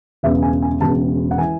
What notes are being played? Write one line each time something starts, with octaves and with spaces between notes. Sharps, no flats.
E1 E2 C#3 E5
G#5
G#5
E1 E2 C#3 A5
F#5
E3 G#5